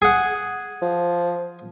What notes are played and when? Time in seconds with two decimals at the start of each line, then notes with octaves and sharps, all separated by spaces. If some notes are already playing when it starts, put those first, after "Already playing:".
0.02 G#4 F#5
0.82 F3